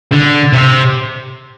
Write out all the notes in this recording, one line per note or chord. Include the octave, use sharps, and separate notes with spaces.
D3
C3